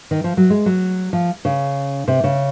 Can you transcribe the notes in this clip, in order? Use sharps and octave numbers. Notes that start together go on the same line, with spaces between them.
D#3
F3
F#3
G#3
F#3
F3
C#3
C3
C#3